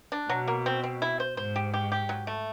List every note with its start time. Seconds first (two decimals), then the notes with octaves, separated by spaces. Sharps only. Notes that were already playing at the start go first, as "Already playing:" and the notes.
0.12 D4
0.29 B2 F#3
0.48 A#3
0.66 C4
0.84 C4
1.02 E4
1.20 C5
1.37 G#2 C5
1.56 G4
1.74 G4
1.92 G4
2.09 F#3
2.27 A3